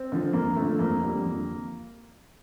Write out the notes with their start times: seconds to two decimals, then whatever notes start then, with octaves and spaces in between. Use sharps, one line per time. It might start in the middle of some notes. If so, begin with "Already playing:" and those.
Already playing: C4
0.12 D3 F3
0.33 F2 A#3
0.56 D3 F3 A3
0.79 F2 A#3
1.02 D3 G3
1.23 F2